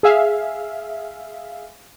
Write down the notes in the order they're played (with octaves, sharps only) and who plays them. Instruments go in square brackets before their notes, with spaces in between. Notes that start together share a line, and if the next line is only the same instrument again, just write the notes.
[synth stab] G#4 E5 F5